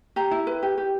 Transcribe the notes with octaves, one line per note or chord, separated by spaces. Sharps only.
G4 A#5
E4
B4
G4
G4